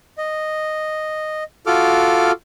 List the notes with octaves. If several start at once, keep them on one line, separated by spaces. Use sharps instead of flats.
D#5
F4 F#4 A4 D6 F6